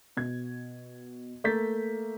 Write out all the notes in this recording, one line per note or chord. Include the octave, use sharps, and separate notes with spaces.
B2 G#6
A3 A#3 G6 A6 B6